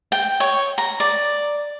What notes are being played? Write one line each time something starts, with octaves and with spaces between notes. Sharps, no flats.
G5
C#5
A#5
D5